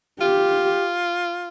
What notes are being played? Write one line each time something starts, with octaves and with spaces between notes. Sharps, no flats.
F4 G4